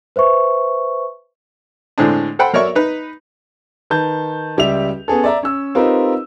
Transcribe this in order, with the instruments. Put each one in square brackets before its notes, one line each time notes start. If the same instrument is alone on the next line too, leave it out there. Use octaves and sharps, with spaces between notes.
[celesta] B4 C5 E5 C#6
[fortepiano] A2 D3 G#3 C4 D4
A4 C5 F#5 G5 B5
F#3 A#4 C#5 D5 E5 C#6
D#4 B4
[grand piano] D#3 B4 A5 G6
C#2 G3 G4 E5 F7
B3 C#4 G#4 A4
D5 E5 A#5
C#4 E6
C4 D#4 F4 G4 A#4 B4